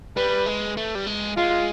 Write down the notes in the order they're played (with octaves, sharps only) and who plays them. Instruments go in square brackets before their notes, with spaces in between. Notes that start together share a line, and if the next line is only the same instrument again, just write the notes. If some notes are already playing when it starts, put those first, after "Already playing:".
[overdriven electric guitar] G3 [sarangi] B4
[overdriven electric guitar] G#3
A3
G3
G#3
[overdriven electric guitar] G#3 [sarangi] F4